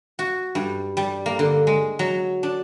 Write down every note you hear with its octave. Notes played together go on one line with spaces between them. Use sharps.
F#4
G2
G3
A#3
D3
G#3
F#3
D4